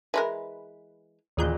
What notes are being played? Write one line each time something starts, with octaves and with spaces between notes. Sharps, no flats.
E3 G#3 A#4 B4
A1 D#2 A#2 G#4 F#6 G6